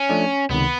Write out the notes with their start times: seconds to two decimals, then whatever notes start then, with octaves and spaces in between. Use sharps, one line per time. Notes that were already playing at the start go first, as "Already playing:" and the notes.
Already playing: C#4
0.10 F3 A3 D4
0.50 C#2 C3 D#3 B3